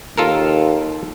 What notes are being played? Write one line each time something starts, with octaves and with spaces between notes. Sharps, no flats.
D#2 F4 A4 A#4